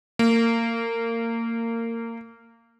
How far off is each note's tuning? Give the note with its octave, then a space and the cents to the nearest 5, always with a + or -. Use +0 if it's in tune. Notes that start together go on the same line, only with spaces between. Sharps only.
A#3 -25